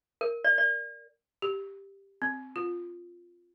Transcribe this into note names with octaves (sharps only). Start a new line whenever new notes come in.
A#4
D5
D5
G4
C4
F4